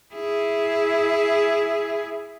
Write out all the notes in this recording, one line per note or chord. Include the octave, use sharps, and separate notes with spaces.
E4 G#4